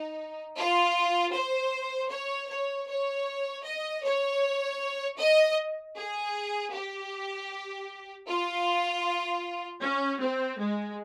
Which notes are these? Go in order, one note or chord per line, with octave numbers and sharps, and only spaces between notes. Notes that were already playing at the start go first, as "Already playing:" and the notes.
Already playing: D#4
F4
C5
C#5
C#5
C#5
D#5
C#5
D#5
G#4
G4
F4
C#4
C4
G#3